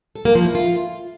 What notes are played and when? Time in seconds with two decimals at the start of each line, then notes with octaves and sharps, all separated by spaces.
0.15 A4
0.25 A#3
0.35 F3
0.45 E4
0.55 F4